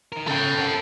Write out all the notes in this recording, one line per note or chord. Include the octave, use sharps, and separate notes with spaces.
D#4 A#4
C#3 A4 G5
A#4 F#5